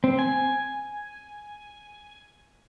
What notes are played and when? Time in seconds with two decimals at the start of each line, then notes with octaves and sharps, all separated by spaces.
0.04 C4
0.19 G#5